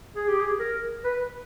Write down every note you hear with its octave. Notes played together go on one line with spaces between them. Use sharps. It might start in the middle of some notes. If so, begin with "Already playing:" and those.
G#4
G4
G#4
A#4
B4